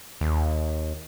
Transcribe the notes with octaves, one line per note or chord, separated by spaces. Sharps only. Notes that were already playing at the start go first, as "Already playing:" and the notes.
D#2